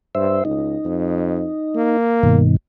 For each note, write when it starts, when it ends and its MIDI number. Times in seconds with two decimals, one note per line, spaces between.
0.15 0.41 43
0.15 0.44 72
0.15 0.44 76
0.45 0.76 37
0.45 1.97 63
0.85 1.48 41
1.75 2.44 58
2.23 2.56 43
2.23 2.56 47
2.23 2.56 51